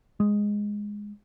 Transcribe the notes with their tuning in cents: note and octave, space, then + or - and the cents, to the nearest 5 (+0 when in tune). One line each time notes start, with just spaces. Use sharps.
G#3 -5